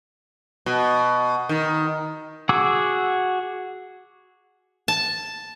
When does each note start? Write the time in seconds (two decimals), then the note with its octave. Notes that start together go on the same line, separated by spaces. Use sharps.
0.66 B2
1.49 D#3
2.49 F#4 G#4 F#5 D6 E6
4.88 A5